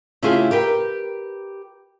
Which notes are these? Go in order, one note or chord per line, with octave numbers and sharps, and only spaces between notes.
C#3 A3 E4 F4 G4 G#4
G4 A#4 B4 G5